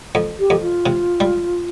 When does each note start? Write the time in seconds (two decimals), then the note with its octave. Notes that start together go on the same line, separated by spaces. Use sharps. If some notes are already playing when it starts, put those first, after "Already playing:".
0.15 F2
0.39 G4
0.50 F2
0.61 F4
0.86 C3
1.20 G3